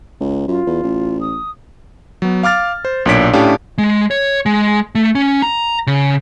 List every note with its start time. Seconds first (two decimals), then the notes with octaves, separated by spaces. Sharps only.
0.21 C#2
0.48 F#2 F4
0.67 E2
0.83 A1
1.21 D#6
2.22 F#3 B3
2.43 F5 D6 F6 A6
2.85 C5
3.06 B1 A#2 D4 C#5 B6 D7
3.33 A2 C#4 D4 G4 F5 A5
3.78 G#3
4.11 C#5
4.46 G#3
4.95 A3
5.15 C#4
5.42 A#5
5.87 C#3